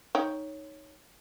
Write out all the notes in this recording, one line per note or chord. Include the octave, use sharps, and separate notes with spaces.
D#4 C#5 G5